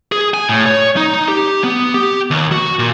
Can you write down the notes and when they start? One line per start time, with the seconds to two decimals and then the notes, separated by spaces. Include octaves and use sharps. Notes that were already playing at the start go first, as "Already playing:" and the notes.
0.12 G#4
0.34 G#5
0.49 A2
0.66 C#5
0.97 D#4
1.28 G4
1.64 B3
1.94 G4
2.30 D#2
2.52 F#4
2.79 A#2